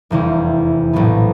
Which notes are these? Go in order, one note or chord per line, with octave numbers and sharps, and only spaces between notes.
F1 E2 C3 E3 G3
A#1 A2 F#3 B3